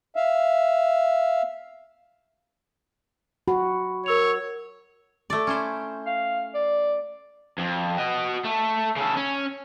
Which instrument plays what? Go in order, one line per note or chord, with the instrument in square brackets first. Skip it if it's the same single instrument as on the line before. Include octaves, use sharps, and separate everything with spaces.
[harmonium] E5 F5
[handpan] F#4 [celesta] B5
[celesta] A#4 E6 F7 [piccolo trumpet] C#5
[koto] A3 D5
C#4 E4 C5
[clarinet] F5
D5
[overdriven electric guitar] F2
F#4 D#5
A3
C#3 A4
C#4